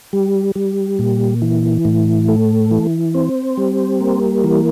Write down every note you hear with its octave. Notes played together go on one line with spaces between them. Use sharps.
G3
G3
A#2
E3
A2
A3
E3
C4
G3
A#3
E3